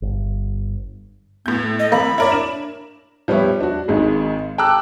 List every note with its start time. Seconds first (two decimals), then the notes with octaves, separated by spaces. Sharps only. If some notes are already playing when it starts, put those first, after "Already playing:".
0.02 G1
1.46 A2 B3 G6
1.61 A3
1.79 D#5
1.92 A#3 C4 B5
2.18 E4 A#4 C#5 D5
2.32 D4 E7
3.28 F3 G3 B3 B4 C#5 E5
3.60 D4 F#4
3.88 G#1 G#2 G#3
4.58 G5 A5 A#5 D6 E6 F#6